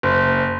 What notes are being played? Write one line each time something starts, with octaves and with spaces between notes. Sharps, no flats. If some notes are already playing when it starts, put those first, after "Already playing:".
F#1